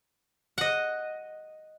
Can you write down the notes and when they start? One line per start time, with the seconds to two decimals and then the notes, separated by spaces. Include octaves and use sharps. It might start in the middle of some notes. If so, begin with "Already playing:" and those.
0.58 D#5 F#5